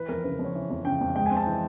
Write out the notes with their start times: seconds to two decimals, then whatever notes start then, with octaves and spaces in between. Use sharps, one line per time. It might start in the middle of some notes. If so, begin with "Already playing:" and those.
Already playing: E3 B4
0.09 F2 A#4
0.24 C#3 B4
0.39 F2
0.44 C#5
0.55 E3
0.70 F2
0.85 C#3 G5
1.01 F2
1.15 G#3 G5
1.26 G#5
1.31 C4
1.37 A5
1.46 E3